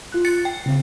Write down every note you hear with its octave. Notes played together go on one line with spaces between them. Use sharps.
F4 F#6
A6 C#7
G5
C#3 C4 F5